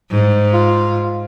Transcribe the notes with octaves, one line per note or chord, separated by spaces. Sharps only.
G#2
F4